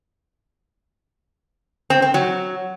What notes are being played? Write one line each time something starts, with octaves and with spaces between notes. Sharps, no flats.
C4
C4
F#3